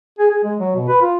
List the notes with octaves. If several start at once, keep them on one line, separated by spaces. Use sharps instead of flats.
G#4
G#4
G#3
F#3
B2
B4
F4